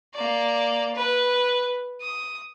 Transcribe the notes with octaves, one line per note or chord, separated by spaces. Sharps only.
A#3 D5
B4
D#6